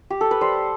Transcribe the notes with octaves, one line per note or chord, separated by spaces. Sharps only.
G4
A4
B4
G3 C5